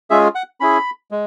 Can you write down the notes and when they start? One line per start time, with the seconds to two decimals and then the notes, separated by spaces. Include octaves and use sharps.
0.10 G#3 C#4 F4 G#4 E5
0.35 F#5
0.60 C#4 E4 G#4 B5
1.11 G#3